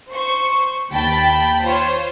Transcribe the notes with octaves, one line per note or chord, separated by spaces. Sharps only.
C5 C#6
D#2 G5 A5 B5 B6
F4 C5 C#5